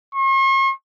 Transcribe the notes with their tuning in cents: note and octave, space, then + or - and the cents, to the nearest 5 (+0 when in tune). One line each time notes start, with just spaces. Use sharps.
C#6 -45